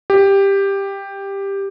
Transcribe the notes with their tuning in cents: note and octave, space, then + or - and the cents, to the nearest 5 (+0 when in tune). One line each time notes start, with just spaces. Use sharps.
G4 +10